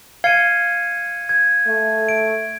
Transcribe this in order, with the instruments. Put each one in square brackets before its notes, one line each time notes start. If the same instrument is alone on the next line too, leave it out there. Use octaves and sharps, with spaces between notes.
[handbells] F5 [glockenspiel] G#6 C#7 D#7
[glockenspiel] G#6
[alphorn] A3
[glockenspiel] D7